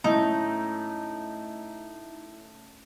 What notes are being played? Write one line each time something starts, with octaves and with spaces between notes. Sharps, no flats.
A2 A3 C#4 D#4 E4 A5 D#6